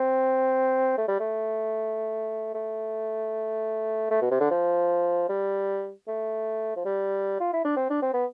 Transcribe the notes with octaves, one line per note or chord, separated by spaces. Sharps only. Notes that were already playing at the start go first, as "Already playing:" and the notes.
Already playing: C4
A3
G3
A3
A3
A3
B2
C3
D3
F3
G3
A3
F3
G3
F4
E4
D4
C4
D4
C4
B3